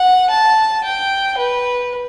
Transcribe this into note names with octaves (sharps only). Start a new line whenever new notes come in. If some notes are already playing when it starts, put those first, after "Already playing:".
Already playing: F#5
A5
G5
B4